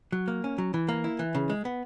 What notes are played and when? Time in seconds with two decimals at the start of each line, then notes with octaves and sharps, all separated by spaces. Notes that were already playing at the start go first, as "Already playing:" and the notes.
0.12 F#3
0.28 A#3
0.44 C#4
0.58 F#3
0.74 E3
0.89 A#3
1.04 E4
1.19 E3
1.35 C#3
1.50 G#3
1.65 B3